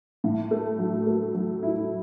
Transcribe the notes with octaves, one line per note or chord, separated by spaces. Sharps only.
A2
A3
F#3
A3
F#3
E4